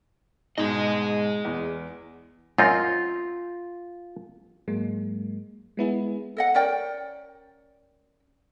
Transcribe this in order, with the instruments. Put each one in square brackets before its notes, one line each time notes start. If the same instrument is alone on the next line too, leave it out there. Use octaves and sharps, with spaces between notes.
[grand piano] G#2 B2 D#4 [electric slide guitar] G#4 D#5
[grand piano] E2
[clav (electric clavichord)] F#2 C4 D#4 [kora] F4
[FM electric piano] G#2 F#3 G#3 A#3
G#3 B3 E4 G#4
[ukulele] A4 D#5 F#5
C#4 A#4 D5 G5